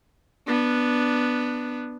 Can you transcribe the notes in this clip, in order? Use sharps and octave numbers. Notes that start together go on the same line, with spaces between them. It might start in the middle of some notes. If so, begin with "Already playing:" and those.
B3 D4